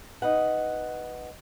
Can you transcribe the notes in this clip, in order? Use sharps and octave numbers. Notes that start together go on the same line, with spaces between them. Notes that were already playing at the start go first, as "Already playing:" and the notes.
D#4 B4 F#5